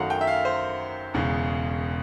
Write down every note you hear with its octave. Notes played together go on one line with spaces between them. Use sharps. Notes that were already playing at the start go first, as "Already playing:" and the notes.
Already playing: F#2 D#3 F#3 A3 F5 F#5
G5
E5
F5
C5
E1 E2 C#3